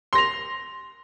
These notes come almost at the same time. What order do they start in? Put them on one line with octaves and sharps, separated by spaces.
C6 A#6 F7